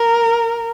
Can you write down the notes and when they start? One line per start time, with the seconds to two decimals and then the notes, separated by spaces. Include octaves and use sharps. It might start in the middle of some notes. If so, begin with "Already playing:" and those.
Already playing: A#4